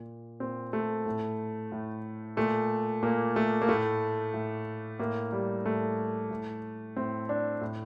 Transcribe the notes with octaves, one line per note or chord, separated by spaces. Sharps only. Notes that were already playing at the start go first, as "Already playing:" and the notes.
Already playing: A#2
A#2 C4
A3
A2
A2
A#2 A3
A#2 A#3
A3
A#3
A2 A3
A2
A2 A#3
G3
A2 A3
A2
A2 C4
D4
A2